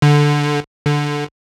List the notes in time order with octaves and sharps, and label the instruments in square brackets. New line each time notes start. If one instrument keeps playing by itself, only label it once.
[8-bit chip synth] D3
D3